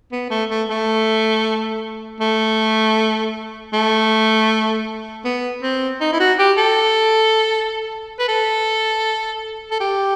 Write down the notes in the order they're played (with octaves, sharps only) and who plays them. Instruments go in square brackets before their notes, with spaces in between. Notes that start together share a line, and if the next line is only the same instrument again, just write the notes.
[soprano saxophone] B3
A3
A3
A3
A3
A3
B3
C4
D#4
E4
F#4
G4
A4
B4
A4
A4
G4